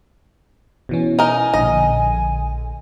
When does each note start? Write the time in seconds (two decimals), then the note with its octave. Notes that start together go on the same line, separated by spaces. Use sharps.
0.89 B2 E3 C#4
1.19 D#4 A#4 G#5
1.54 A#1 D3 D#5